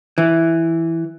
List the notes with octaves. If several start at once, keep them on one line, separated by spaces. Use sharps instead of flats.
E3